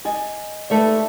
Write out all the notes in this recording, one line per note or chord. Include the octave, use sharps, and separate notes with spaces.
D5 D#5 G#5
D#2 A3 B4 D5 E5 A5